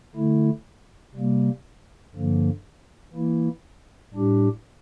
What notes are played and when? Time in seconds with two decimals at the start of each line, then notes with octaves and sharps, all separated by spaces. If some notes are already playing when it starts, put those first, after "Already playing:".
0.15 D3 A3 E4
1.15 C3 G3 A#3
2.15 G2 D3 F3 A#3
3.14 E3 A#3 E4
4.14 A2 G3 D4 G4